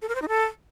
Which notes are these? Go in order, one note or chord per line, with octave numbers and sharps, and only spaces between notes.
A4
A#4
C5
D#4
A4